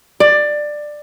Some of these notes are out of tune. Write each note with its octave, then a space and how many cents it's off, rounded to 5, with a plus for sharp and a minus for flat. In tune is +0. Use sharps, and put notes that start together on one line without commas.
D5 +15